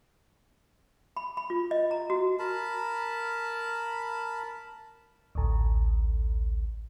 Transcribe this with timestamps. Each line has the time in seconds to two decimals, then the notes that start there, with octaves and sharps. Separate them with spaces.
1.17 B5
1.37 B5
1.50 F4
1.71 D#5
1.91 A#5
2.10 F#4
2.39 A#4 A5 B5
5.35 A1 D2